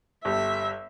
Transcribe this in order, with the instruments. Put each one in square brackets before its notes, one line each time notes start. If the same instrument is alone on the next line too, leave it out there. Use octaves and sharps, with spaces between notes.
[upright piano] G1 G4 A4 [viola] E5